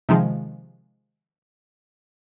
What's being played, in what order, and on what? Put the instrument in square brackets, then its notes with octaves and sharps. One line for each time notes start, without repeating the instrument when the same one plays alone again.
[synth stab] C3 D#3 F3 G#3